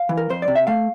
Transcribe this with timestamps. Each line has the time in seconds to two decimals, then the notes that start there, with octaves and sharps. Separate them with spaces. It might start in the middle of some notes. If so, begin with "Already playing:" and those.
Already playing: F5
0.09 E3
0.17 A#4
0.30 F2 C5
0.42 D5
0.48 C3
0.55 E5
0.67 A3 F5